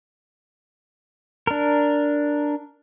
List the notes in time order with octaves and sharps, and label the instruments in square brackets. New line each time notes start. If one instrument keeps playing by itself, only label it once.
[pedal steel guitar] D4 A#4